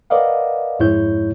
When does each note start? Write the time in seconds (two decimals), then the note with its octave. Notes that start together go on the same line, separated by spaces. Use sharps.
0.10 A#4 B4 D5 D#5 F5 F#5
0.79 F2 G#2 G#3 E4 C#5 G6